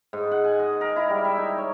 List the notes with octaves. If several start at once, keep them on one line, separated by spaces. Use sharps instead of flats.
G#2
F#5
G#5
D#5
A#4
E4
G3
E5
D#4
C#5